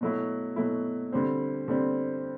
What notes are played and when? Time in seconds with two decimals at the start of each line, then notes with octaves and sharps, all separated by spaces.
0.01 B2 F#3 A3 E4
0.56 B2 F#3 A3 E4
1.12 D3 G3 C4
1.68 D3 G3 C4